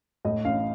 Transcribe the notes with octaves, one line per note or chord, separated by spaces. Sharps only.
A2 D#5
A1 F5